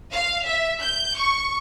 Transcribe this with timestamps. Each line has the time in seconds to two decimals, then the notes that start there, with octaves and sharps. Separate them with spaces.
0.12 F5
0.46 E5
0.80 G6
1.17 C#6